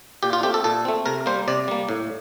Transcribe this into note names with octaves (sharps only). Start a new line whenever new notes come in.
A#2 G4
F4
A3 C4 G4
A4
A#2 A4
A3 C4
C3 A#4
G3 A#3 C5
C3 D5
G3 A#3
A2